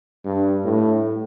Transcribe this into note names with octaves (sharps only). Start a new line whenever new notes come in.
G2
A2